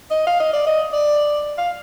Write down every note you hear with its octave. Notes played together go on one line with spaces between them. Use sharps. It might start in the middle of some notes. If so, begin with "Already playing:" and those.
D#5
F5
D#5
D5
D#5
D5
F5